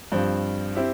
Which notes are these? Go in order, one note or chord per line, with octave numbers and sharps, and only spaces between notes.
G2 F3 C4
C4 E4 G4